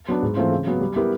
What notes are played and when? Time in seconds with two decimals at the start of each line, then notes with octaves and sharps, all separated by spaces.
0.08 F#3 B3 D4
0.22 G#2
0.37 E3 A3 C4 F4
0.52 C#3
0.67 F#3 B3
0.81 G3
0.96 B3 E4 G4 A#4